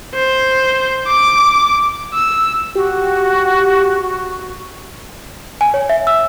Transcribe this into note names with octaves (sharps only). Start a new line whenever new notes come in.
C5
D6
E6
F#4 G4
G#5
C#5
E5
E6